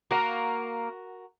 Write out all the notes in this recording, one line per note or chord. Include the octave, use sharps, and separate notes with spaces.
A#3 F#4 A#4